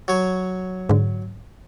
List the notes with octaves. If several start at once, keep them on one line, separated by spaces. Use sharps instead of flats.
F#3 C#5
G#2 D3